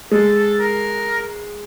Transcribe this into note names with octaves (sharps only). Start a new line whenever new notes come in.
G#3 A4
A4
A#4